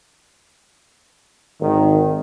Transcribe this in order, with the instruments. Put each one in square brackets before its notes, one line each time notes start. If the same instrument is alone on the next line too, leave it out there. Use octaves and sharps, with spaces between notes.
[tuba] G#1 [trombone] D#3